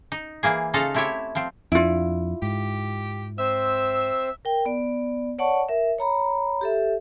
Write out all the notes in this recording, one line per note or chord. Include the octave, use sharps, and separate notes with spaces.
D#4
E3 A#3 G#4
C#3 D#4 F4 A4 A#5
A3 C4 E4 G4 C#5 E5
F3 C4
F2 D4 E4 F4
G#2 G4
C4 C5 E5 E6
A#4 G5
B3 D5
C#5 D5 F#5 A5 C#6
A#4 E5
C#5 A#5 B5
G4 A4 E5